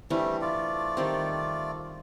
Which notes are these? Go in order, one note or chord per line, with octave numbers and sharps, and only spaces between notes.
E3 G3 A3 C4 D4
A3 F4 D5
D#3 G3 C4